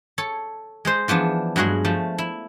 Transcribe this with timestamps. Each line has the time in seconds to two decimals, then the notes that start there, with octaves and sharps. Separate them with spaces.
0.18 A4 C#5
0.85 G#3 G#4 C5
1.08 E3 F3 B3 D4
1.56 G2 F#3 G#3 F#4 G#4
1.85 F3 A3
2.18 E4